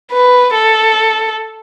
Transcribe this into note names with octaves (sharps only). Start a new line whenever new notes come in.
B4
A4